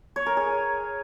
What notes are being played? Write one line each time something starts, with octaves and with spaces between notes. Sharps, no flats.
C#5
A#4
G#4